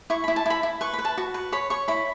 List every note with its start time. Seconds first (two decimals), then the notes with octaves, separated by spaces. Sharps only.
0.10 E4 C#6
0.24 E4 B5
0.36 A5
0.46 E4 B5
0.63 E4
0.81 B4 C#6
0.93 B5
0.98 B4
1.05 A5
1.18 F#4
1.34 B4
1.52 C#5 B5
1.70 C#5 C#6
1.88 E4 B5